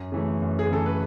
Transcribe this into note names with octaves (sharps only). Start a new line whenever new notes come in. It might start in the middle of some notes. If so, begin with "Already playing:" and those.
Already playing: F#2
C#3 E3 A3
F#2
G#4
C#3 E3 A3 A4
B4